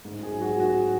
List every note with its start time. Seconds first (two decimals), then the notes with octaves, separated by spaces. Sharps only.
0.05 G#2
0.23 G#4
0.32 F#3
0.41 F#4
0.60 G#2 F#4